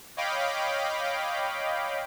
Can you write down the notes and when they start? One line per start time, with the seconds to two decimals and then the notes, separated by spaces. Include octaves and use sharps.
0.17 C#5 D#5 F5 G5 B5 D6